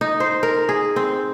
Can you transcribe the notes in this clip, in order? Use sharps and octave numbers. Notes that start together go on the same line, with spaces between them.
D#4
C5
A#4
G#4
C4